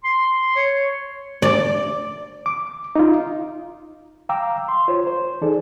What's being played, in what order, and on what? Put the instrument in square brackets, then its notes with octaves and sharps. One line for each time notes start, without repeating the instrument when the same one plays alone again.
[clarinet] C6
C#5
[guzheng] D5
[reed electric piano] D6
D#4 F4
F5 G5 A#5 D6 E6
C6
F4 C5 C#5
C5
E3 D#4 G#4 A4 D5